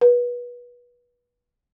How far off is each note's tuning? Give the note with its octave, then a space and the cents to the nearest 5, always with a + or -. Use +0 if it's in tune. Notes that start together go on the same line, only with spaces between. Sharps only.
B4 -25